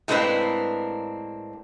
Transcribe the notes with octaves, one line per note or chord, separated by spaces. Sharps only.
A2 G#3 A#3 C4 D4 B4